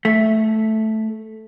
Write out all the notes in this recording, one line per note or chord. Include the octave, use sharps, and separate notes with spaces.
A3